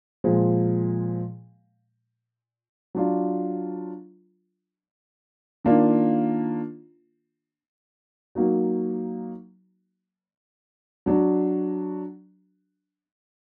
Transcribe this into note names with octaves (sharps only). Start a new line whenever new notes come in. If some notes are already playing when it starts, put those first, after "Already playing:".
A#2 F3 G#3
F#3 D4 F4
D#3 A#3 D4 F4
F#3 A#3 D#4 F#4
F#3 D4 F#4